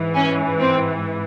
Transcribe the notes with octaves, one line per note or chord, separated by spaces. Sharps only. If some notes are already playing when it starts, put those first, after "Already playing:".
Already playing: G#2 E3
C#4
C4